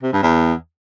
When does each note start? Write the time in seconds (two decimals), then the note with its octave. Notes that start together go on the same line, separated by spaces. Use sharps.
0.02 C3
0.13 G2
0.23 E2